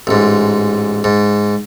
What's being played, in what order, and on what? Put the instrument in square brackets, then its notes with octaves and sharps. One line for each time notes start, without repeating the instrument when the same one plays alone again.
[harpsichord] A1 G#2
G#2